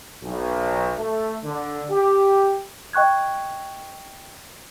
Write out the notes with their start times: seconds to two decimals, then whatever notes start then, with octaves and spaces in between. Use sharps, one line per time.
0.23 B1
0.97 A3
1.44 D3
1.90 G4
2.93 D#5 G5 C#6 F#6 G#6